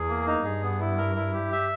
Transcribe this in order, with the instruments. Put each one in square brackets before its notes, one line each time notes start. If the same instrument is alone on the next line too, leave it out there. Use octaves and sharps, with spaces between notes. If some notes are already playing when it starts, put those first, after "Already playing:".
Already playing: [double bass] E2 [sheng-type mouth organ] G#4
[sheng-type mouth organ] A#3
D#4
[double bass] G2 [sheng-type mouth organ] G#4
[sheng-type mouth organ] B3
E4
A#4
E4
G4
E5